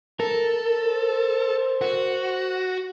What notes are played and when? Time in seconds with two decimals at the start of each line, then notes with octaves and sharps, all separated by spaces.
0.20 A4 A#4
0.78 C5
1.81 F#4